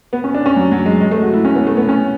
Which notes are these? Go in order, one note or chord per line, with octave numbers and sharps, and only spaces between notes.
B3
C#4
D4
C#4
F#3
F#3
G#3
G#3
A3
F#4
E4
C#4
B3
A3
B3
C#4